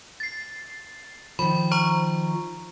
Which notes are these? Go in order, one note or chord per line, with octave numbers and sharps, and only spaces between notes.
A6 C7
D#3 F3 B5
C5 A#5 C#6